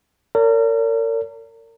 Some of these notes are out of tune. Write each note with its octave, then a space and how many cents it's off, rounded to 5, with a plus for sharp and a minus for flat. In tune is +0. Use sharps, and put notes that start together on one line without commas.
A#4 -35 C#5 +45